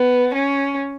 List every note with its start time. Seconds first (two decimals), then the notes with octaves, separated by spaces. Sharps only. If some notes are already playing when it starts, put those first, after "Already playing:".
Already playing: B3
0.34 C#4